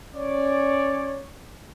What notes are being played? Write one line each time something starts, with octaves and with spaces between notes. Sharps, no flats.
C#4 C#5 D5